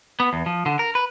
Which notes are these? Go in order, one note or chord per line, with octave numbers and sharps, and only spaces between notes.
B3
E2
F3
D3
A#4
B4